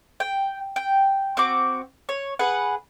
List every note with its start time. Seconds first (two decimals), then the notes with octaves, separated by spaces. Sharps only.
0.20 G5
0.76 G5
1.37 C4 F#4 D6
2.09 C#5
2.39 G#4 B4 F#5